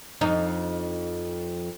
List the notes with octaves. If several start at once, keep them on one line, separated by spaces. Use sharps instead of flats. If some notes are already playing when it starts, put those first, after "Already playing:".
F2 D#4